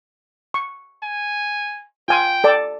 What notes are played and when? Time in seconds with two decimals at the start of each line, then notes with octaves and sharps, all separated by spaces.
0.54 C#6
1.03 G#5
2.08 F4 G5 G#5 C6
2.44 A4 D5 A5